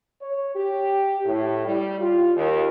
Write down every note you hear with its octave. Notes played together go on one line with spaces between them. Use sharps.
C#5
G4
A2
G3
F4
D#2